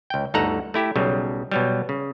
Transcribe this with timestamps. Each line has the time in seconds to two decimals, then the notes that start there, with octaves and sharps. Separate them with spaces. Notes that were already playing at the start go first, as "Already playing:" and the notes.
0.10 C#2 G5
0.34 G1 D2 D#4 A4 F#5 A#5
0.74 A3 E4 G4
0.96 B1 C#3 F#3 G3
1.51 B2 F#3 G3
1.89 C#3